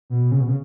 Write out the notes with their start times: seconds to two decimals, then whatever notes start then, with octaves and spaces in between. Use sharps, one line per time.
0.10 B2
0.32 C#3
0.40 B2
0.48 C#3